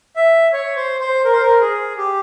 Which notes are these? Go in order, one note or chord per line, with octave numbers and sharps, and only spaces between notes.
E5
C#5
C5
C5
A#4
C5
A#4
G#4
G4